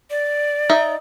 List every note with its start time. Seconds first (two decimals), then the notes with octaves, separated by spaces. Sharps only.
0.11 D5
0.69 D#4 D#5 E5